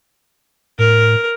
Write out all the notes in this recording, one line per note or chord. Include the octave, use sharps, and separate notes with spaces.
A2 A#4